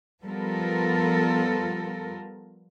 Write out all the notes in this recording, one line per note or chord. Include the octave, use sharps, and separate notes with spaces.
F3 G3 B3 F4 A4 A#4